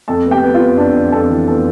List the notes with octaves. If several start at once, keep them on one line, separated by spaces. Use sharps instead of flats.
F2 A4 A5
B3
G4 G5
B3
F4 F5
B3
F2 D4 D5
F2
F2 A4
E3
B3 A4